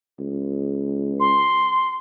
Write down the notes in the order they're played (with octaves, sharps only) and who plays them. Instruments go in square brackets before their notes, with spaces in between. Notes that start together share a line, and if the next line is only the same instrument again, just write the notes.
[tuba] C#2
[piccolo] C6